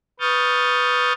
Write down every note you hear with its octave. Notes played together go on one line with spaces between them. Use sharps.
B4 C#6 D#6 F6 G6 A6